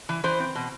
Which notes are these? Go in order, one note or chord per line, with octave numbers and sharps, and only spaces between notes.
E3
E3 C5
C4
B2